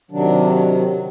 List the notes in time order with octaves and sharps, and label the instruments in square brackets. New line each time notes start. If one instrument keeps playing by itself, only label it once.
[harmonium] C3 D#3 F#3 D4